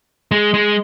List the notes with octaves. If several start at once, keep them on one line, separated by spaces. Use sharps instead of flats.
G#3
G#3